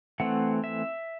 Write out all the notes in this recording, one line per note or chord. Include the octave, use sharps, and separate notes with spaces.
E3 A3 C4 F#5
E5